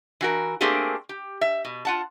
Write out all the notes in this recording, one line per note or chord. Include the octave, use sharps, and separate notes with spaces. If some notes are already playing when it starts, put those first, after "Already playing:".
E3 F#4 A#4
A3 A#3 C4 D4 G4 G#4
G4
E5
B2
F4 F#5 A5